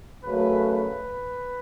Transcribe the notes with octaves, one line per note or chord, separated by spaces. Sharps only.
F#2 C#3 F#3 A3 B4
B4